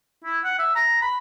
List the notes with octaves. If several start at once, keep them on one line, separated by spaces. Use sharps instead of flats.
E4
F#5
E5
A#5
B5